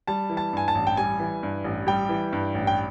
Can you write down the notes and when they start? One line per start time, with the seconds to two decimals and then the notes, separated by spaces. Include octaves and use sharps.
0.07 G3 A5
0.30 E3
0.37 A5
0.53 G2 G#5
0.68 A5
0.75 A1
0.87 G5
0.97 G3 G#5
1.19 E3
1.43 G2
1.64 A1
1.87 G3 G5
2.09 E3
2.33 G2
2.54 A1
2.67 G5